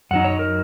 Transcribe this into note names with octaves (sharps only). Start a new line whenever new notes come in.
F#2 F#3 D#4 F#5
C#5
A#4